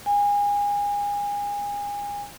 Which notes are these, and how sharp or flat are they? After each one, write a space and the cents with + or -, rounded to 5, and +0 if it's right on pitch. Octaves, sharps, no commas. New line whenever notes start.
G#5 -30